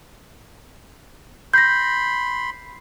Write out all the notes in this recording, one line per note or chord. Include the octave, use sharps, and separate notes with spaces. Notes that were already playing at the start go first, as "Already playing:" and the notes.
B5 C6 G6 A#6